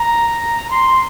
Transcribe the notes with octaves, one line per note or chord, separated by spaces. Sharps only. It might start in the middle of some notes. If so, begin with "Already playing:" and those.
Already playing: A#5
C6